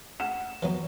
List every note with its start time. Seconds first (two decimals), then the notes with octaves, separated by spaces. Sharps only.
0.20 F#5 E7
0.62 E3 F#3 B3